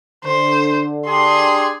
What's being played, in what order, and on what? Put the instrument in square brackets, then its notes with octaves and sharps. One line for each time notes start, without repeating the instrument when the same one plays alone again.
[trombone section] D3 [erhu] C5
[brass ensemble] D4 G4 G#4 [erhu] C6